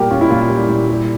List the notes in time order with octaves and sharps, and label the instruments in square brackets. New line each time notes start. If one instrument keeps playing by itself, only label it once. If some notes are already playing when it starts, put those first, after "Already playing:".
Already playing: [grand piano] A#2 G3 [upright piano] G4 A#4
[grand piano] C#4 [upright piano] F4
[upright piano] E4
[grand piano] A#2 [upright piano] F4
[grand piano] G3
A#2
G3